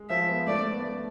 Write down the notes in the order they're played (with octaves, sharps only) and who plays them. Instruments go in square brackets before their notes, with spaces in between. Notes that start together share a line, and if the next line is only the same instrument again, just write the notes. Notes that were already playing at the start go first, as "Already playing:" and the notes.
Already playing: [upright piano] G#3
[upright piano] F3 [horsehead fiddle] E5
[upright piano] B3
[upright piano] A3 [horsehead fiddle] D5
[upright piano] A3
B3
A3